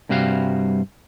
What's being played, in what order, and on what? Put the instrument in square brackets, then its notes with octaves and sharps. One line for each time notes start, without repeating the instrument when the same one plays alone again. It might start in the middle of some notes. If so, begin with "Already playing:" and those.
[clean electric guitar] G2 C3 G3 F#4 F5